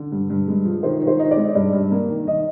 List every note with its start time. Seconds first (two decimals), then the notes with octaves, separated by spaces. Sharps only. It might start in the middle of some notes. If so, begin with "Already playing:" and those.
Already playing: D3
0.12 G2
0.30 G2
0.48 G#3
0.65 F3
0.83 D#3 C5
1.01 D#3
1.07 C5
1.19 D#4
1.31 D5
1.37 G#3
1.49 D#5
1.55 G2 D5
1.73 G2
1.92 A#3
2.09 D#3
2.27 D#3 D#5